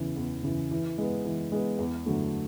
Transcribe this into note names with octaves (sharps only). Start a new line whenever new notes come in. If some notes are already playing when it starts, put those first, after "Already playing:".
Already playing: E2 C#3 E3
E2
C#3 E3
E3
G#3 B3
E3
G#3 B3
E2
D3 F#3 A3